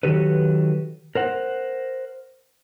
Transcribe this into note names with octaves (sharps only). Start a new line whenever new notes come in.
D#3 F#3 G4 A4 B4
A#4 C5 F#5